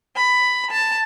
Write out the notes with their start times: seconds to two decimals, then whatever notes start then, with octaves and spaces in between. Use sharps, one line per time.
0.17 B5
0.72 A5